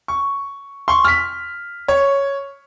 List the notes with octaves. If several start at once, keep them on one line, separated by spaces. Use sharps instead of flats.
C#6
C6 C#6
F6 B6
C#5